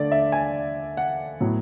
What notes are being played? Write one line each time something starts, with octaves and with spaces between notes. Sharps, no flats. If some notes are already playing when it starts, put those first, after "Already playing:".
Already playing: D3 A3 D5
E5
G#5
F#5
A2 F#3 B3